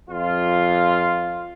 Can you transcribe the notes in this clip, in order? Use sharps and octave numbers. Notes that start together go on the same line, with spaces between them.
F2 F4